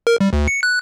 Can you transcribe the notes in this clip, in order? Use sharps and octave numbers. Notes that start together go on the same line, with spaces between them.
A#4
G3
D2
C#7
F#6